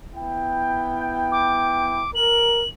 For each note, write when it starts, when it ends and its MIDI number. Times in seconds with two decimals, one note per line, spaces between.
0.16 2.08 59
0.16 2.08 64
0.16 2.08 79
1.32 2.11 86
2.15 2.65 70
2.15 2.68 102